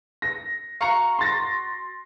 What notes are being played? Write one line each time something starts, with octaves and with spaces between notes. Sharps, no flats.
A#6
F#4 F5 A#5 C#6
C6 A6 A#6